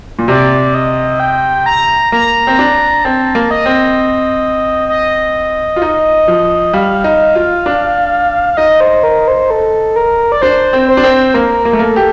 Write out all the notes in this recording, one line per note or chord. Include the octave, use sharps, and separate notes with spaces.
A#2
C3 D5
D#5
G5
A#5
A#3 A#5
C4
D4
C4 A5
A#3
D#5
C4
D#5
F4
D#4
F3
G3 F5
D#4
F4
D4
F5
D#4 D#5
C5
A#4
C5
A4
A#4
D5
D4 C5
C4
C5
D4
C4
A#3 A#4
A#3
A3
A#3 A4
G4